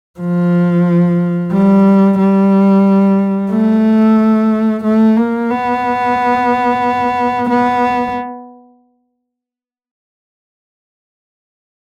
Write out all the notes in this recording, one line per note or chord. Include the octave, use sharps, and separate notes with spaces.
F3
G3
G3
A3
A3
A#3
B3
B3